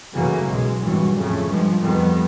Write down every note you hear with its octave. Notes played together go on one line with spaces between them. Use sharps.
F#2 C#3 E3 F#3 A3 A#3
B1 F#2 G#3
G#1 G2 B2 E3 F#3
F2 A2 C#3 A3
G2 F3 G#3
F2 D#3 G3 B3